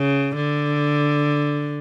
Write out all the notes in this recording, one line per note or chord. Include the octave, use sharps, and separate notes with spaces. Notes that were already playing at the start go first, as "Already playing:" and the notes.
Already playing: C#3
D3